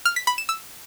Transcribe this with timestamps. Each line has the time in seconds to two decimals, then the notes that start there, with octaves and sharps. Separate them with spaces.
0.05 F6
0.16 B6
0.27 B5
0.38 E7
0.49 E6